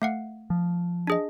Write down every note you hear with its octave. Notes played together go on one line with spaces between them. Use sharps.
A3 F5 F#5
F3
D4 G#4 D#5